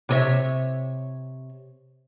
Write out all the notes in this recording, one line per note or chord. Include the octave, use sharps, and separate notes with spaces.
C3 C#5 E5